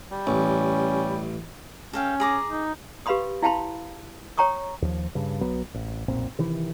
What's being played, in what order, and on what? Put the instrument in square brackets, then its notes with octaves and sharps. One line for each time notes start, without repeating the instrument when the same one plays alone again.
[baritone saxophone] G3
[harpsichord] A1 [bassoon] C#4
[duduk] C#4 [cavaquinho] A4 F5 G5
[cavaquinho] G#4 A#5 D6
[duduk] D#4
[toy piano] G4 B4 F5 B5 C6 D#6
E4 F5 G5 A5 B5 C6
C#5 G5 A#5 C#6 D#6
[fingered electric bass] D#2 F3
G2 C#3
B1 F#3 B3
A1
F1 B1 A#2 C4
C3 D#3 E3